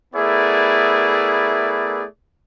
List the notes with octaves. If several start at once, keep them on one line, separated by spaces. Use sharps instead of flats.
A3 B3 E4 G#4 A#4 D5